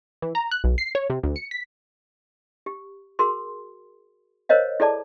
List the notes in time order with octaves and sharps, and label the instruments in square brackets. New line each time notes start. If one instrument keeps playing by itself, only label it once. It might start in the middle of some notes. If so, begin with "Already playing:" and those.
[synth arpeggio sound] E3
A#5
F#6
B1
C7
C#5
C3
D2
C#7
B6
[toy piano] G4
F#4 G#4 A#4 C6
A#4 C5 C#5 D#5 F5
E4 G#4 A4 D5 A5